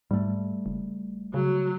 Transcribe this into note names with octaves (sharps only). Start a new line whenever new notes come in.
G#2 G3 A3
F#1
C#3 F#3